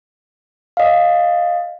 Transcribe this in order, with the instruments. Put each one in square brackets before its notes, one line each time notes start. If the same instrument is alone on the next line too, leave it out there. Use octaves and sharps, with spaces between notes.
[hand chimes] D#5 F5